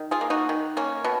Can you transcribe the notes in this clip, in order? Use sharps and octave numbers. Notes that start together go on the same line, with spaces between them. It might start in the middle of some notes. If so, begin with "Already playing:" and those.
Already playing: D#3
F4 G#4
A#3
D#4 F#4
D#3
A#3 C#4
B2